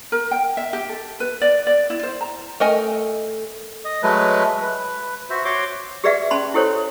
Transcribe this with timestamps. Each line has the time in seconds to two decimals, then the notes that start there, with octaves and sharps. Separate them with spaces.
0.12 A#4
0.31 G5
0.57 E5
0.73 G4
0.89 A4
1.20 B4
1.41 D5
1.67 D5
1.90 E4
2.03 C5
2.21 A#5
2.60 A3 A#4 D#5 G#5
3.85 D#5
4.03 F#3 G#3 A3 B4
4.62 B4
5.30 F#4 C5 E5
5.45 F#4 C#5 C6 D6
6.04 G4 G#4 B4 D5 E5 F#5
6.31 C#4 A5 B5 C6
6.54 E4 G4 A4 C5 C#5